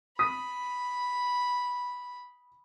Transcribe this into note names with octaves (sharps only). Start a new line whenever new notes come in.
B5 D#6 B6